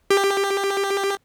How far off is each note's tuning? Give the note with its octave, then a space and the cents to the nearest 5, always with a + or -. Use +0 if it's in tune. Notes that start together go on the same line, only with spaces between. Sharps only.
G4 +15